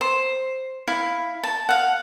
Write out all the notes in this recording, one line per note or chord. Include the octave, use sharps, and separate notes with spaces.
C5
E4 F5
A5
F5 F#5